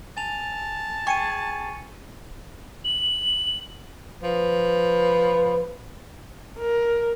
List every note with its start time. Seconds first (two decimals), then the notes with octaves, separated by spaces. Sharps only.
0.17 G#5 A5 F7
1.07 G#4 G5 C#6 C#7 D#7
2.84 F#7
4.23 F3 B4
6.59 A#4